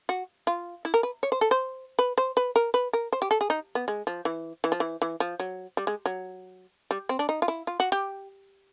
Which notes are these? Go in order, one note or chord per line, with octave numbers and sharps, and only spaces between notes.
F#4
F4
E4
A#4
B4
C#5
C5
A4
C5
B4
C5
B4
A#4
B4
A#4
C5
G4
A4
G#4
D#4
B3
G#3
F3
E3
E3
F3
E3
E3
F3
F#3
G3
G#3
F#3
G3
C4
D4
D#4
F4
E4
F4
F#4
G4